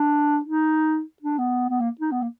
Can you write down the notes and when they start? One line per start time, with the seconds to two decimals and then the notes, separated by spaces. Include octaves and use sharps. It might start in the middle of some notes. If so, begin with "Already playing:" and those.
Already playing: D4
0.45 D#4
1.22 D4
1.38 B3
1.69 B3
1.80 A#3
2.01 D#4
2.11 B3
2.22 A#3